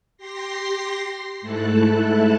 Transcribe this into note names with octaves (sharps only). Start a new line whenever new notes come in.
G4 C6 A#6 C7
G#2 A3 E4 A4 A5 F#6